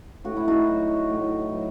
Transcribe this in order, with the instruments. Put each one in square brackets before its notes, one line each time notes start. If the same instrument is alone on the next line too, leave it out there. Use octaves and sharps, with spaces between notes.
[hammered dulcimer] A2 F#4
E4
D#4 F#4
F#3
A2
F#3